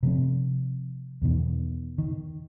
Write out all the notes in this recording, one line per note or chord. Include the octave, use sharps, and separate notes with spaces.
C3 F3 C4
E2 B2 D#3
D#3